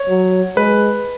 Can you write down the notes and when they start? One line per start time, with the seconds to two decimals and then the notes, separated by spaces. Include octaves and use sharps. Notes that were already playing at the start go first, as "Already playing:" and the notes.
Already playing: C#5
0.09 F#3
0.56 G#3 B4